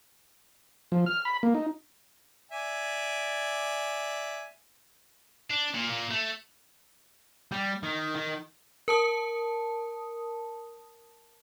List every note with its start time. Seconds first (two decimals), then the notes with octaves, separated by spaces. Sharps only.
0.92 F3
1.06 F6
1.25 B5
1.43 A#3
1.55 D#4
2.51 D5 E5 G#5
5.50 D4
5.75 A#2
5.91 A#2
6.11 A3
7.51 G3
7.83 D#3
8.16 D#3
8.88 A#4 A5 D#6